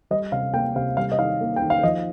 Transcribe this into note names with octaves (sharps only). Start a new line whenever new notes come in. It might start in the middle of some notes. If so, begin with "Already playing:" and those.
G3 D#5
C3 F5
A#3 G5
C3 F5
G3 F5
D#5
D#3 F5
A#3
G5
D#3
F5
F3 D#5